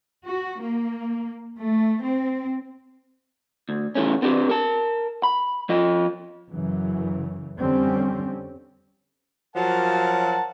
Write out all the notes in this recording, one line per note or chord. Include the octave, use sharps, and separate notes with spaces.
F#4
A#3
A3
C4
D2
C#3 E3 A3 C#4
B3 C4 D4 F4 G4 B4
A#4 A5
B5
F3 F4 D#5
F#2 C#3 E3 F#3
F2 D3 G3 C4 C#4
F3 F#3 A#4 F#5 A5